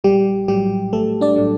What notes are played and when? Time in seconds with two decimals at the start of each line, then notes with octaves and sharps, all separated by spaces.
0.04 A#1 G3 G4
0.48 A2 F#3 G3 G4
0.93 A#1 A3 A4
1.21 D4 D5
1.36 A2 F#3